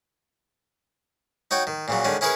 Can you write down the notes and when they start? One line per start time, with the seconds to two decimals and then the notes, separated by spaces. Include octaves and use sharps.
1.51 D#4 F#4 C#5 G5
1.67 D#3
1.88 A#2 C#3 F#3
2.04 D3 D#3 G#3 C#4
2.21 C#4 E4 G#4 A#4 B4 C#5